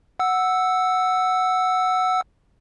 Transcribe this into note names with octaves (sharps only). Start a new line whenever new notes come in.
F#5 E6